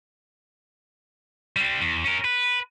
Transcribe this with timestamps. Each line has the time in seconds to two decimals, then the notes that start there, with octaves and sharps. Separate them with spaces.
1.56 G3 C4
1.81 E2
2.04 C#4 A#4
2.25 B4